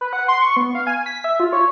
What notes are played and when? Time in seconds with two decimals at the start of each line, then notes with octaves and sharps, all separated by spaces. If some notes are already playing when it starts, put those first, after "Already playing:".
0.01 B4
0.13 F#5
0.28 C6
0.42 C#6
0.57 B3
0.75 F5
0.87 G#5
1.06 B6
1.24 E5
1.40 F4
1.53 C#5